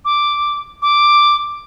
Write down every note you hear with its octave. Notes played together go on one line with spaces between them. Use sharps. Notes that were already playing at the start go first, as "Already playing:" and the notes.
D6
D6